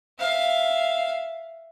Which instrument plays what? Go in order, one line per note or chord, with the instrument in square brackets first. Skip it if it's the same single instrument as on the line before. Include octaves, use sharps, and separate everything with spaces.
[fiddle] E5 F5